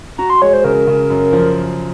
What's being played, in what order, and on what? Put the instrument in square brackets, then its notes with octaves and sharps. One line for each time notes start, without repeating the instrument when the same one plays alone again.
[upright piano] F#4 [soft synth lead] A#5
[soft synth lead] C6
[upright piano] G#3 [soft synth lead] C#5
[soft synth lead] C5
[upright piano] C#3 [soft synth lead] A#4
[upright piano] C#3
F#2
F3